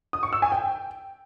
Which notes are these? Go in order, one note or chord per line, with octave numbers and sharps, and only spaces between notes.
D#6
C#6
E6
G#5
G5